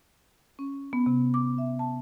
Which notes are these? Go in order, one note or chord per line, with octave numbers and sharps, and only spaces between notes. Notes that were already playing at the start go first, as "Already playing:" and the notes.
C#4
B3
C3
D6
E5
A5